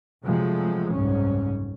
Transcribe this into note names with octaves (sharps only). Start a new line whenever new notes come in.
C3 F3 F#3 G#3 A3
F#1 C2 G#2 C#3 C#4